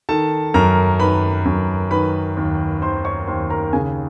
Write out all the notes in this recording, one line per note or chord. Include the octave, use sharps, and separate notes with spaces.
D#3 A4 A5
F#2 A#4 A#5
D#3 B4 B5
F#2
D#3 B4 B5
D#2
D#3 C5 C6
C#5 C#6
D#2 C5 C6
A#4 A#5
C#3 G#4 G#5